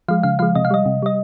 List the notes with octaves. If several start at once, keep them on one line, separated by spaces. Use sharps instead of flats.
F3 G#3 F5
C#3 F5
F3 G#3 F5
C3 D#5
F5
G3 D#5
C3
G3 D#5